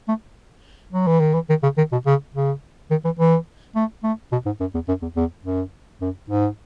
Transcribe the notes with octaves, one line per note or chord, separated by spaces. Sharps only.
A3
F#3
E3
D#3
E3
D#3
C#3
D#3
B2
C#3
C#3
D#3
E3
E3
A3
A3
B2
G#2
F#2
E2
F#2
E2
E2
F#2
F#2
G#2